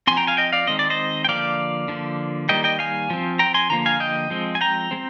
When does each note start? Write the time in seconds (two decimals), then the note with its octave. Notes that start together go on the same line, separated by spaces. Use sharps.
0.07 F3 C4 G#5 C6
0.17 G5 A#5
0.27 F5 G#5
0.37 D#5 G5
0.53 D5 F5
0.67 D#3 G#3 C4 D#5
0.79 D5
0.90 C5 D#5
1.25 G5
1.29 D3 F3 A#3 D5 F5
1.88 D3 F3 A#3
2.49 D#3 G3 A#3 D#5 G5
2.64 D#5 G5
2.79 F5 G#5
3.10 F3 C4
3.39 G5 A#5
3.54 G#5 C6
3.70 D3 F3 A#3 A#5
3.86 F5 G#5
4.00 D#5 G5
4.30 F3 G#3 C4
4.55 G#5
4.61 G5 A#5
4.91 G#3 C4